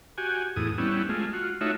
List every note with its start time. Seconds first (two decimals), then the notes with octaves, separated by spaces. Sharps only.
0.18 F#4 G4 G#5
0.56 E2 A2 G#4 D#6
0.78 G3 B3 C#4 E4
1.09 G#3 A3 F4
1.33 F4 F#4
1.61 A3 D#4 F4 F#4 C#5 E5